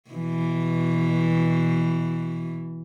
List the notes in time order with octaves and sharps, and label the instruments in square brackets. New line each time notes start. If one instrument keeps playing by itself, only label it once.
[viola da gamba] B2 E3